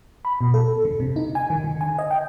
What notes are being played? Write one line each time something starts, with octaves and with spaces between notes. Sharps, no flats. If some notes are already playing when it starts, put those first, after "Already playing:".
B5
B2
A4
D3
C3
D#4
G#5
D#3
D3
G#5
D#5
G5